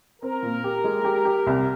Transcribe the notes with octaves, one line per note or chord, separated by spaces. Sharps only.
C4 A#4
A#2
G4
G#3
G4
G4
C2